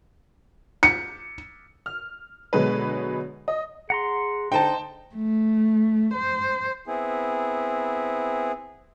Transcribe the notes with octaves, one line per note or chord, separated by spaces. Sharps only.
C#7
F6
B2 D3 F#3 G#3 G#4 B4
D#5
G#4 F#5 A#5 C6
D3 D#4 C5 G5 A5
A3
C5
B3 C4 E4 G#4